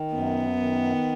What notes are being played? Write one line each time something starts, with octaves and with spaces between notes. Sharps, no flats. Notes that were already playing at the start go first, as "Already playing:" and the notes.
Already playing: D#3
F#2 B3
D#3